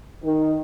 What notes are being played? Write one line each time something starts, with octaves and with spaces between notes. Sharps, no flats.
D#3